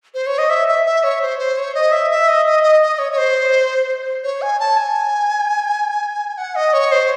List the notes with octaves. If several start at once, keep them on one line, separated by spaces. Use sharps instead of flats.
C5
C#5
D#5
E5
E5
E5
C#5
C5
C5
C#5
D#5
E5
E5
D#5
D#5
D#5
D#5
C#5
C#5
C5
C#5
G#5
A5
G#5
F#5
D#5
C#5
C5